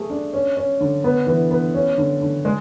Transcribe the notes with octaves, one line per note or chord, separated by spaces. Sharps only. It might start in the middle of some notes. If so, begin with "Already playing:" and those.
Already playing: A3 G#4
D4
C#4
C#4
D3
B3
E3
B3
C#4
D3
D3
G#3